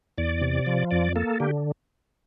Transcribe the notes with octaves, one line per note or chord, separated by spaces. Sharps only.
E2 D5
C3
F3
F2 D5
A#3 A4
D3 G4